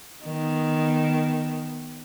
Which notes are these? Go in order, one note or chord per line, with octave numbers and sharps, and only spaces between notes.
D#3 B3